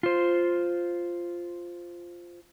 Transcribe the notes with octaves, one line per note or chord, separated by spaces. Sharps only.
F4 C5